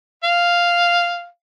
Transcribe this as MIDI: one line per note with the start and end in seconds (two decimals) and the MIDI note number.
0.24 1.26 77